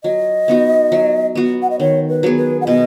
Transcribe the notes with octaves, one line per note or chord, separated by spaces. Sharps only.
F#3 D#5
B3 D#4 F#4
F#3
B3 F#4
F#5
D#5
D#3 C#5
B4
F#3 B3 G#4
B4
F#5
B2 D#5